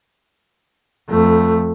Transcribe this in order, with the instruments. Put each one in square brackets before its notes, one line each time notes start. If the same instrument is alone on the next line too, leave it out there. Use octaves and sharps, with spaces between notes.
[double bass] F2 A3